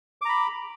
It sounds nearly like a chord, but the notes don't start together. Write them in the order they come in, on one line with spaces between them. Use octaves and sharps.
D6 A#5 B5